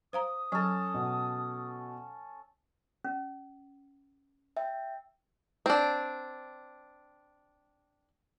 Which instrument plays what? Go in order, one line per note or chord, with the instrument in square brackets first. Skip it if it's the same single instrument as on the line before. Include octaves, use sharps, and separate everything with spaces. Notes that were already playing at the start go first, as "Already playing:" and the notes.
[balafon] C5 F5 A#5 [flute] D#6
[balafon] F#3 [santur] C#4 A4
[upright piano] B2
[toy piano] C#4
[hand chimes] E5 G5
[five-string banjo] C4 D4